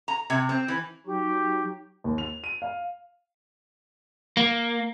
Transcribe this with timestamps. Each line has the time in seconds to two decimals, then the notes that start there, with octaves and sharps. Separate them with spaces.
0.08 A#5
0.30 C3
0.49 C4
0.68 E3
1.06 F#3 D#4 F#4 G4
2.04 D#2
2.18 F7
2.44 D#7
2.62 F5
4.37 A#3